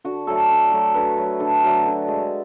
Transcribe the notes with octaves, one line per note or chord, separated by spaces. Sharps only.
D3 F#4
F#3 A3 A4
D3
F#3 A3
D3 B4
F#3 A3
D3 A4
F#3 A3
D3
G#3